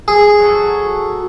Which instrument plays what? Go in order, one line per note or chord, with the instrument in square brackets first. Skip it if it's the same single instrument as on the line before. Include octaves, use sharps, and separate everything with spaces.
[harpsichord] G#4
[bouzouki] F#3 F#4 A4